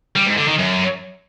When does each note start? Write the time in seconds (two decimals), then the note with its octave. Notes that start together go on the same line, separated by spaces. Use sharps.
0.16 G3
0.27 G#2
0.38 D3
0.48 D#3
0.59 F#2